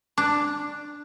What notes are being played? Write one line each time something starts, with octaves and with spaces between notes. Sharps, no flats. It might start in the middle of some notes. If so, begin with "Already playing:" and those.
D4